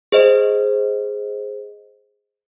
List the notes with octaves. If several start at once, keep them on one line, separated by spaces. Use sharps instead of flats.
G#4 C5 D#5